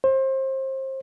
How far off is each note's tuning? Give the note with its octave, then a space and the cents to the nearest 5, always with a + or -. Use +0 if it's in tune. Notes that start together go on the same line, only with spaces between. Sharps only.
C5 +30